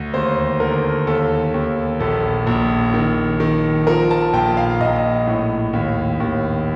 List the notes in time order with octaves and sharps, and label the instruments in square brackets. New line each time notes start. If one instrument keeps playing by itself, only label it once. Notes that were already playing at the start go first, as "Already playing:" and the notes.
Already playing: [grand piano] D2
D#2 C5
D3 A#4
D#2 A4
D#2
A#1 A4
A#1
D#3
D#3
F3 A#4
A5
A#1 G5
F5
A#1 D#5
A2
D#2
D#2